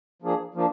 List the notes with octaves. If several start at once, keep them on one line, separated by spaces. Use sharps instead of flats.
F3 A#3 D4 G#4
F3 A#3 D4